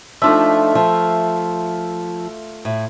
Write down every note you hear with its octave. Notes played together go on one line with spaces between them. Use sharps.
F3 A3 D4 D#4 F4 E5
F3
A2